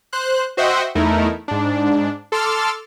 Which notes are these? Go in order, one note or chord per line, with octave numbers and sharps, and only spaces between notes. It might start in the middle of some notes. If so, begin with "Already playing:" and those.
C5 F#6
F#4 C5 D#5 E5 F#5 G5
E2 A3 D#4 E4 A#4
G#2 D4
A4 C6 D6 E6 F6 A6